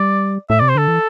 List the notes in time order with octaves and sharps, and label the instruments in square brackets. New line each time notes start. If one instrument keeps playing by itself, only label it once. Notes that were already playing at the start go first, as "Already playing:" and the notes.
Already playing: [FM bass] G3 [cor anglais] D5
[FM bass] A2 [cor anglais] E5
[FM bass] C3 [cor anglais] D5
[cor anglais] C5
[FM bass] D3 [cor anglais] A4
[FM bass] E3